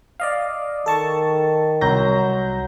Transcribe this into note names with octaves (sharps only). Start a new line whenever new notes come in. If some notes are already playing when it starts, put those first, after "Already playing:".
D5 D#5 F5
D#3 A4 A5 C#6
C2 F#3 G6 A#6